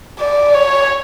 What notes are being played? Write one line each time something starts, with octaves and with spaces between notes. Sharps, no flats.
D5
C#5